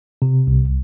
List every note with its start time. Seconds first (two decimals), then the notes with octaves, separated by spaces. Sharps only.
0.22 C3
0.47 C2